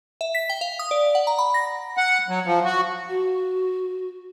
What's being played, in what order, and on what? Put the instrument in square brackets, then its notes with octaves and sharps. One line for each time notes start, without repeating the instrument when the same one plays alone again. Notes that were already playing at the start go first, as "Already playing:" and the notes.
[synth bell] E5
B6
G5
F5
D#6
D5
F#5
A#5
B5
A#6
[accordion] F#5
F#3
F3
F#4
[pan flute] F#4